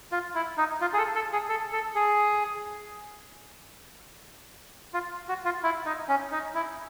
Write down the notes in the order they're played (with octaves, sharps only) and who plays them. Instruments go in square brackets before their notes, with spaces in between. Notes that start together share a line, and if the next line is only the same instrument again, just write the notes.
[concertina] F4
E4
D#4
F4
G#4
A4
A4
G#4
A4
A4
G#4
F4
F#4
F4
E4
D#4
C#4
D#4
E4